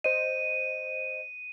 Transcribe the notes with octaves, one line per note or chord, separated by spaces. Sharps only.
C5 D#5 D#7